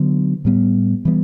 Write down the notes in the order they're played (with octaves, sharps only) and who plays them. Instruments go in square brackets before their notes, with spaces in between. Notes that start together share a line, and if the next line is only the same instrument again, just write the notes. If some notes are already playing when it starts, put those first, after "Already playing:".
Already playing: [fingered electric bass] D3 F#3 B3
A2 G3 B3
E3 G3 B3